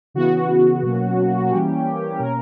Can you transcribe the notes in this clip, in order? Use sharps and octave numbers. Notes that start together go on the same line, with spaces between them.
C#3 E3 B3 F#4
B2 F#3 A#3 C#4
E3 G3 A#3 C#4 G4
B2 A#3 C#4 A#4